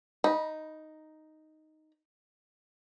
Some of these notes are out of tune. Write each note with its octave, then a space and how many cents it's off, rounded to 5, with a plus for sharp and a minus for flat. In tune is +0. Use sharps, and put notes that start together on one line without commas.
D#4 +0 B5 -25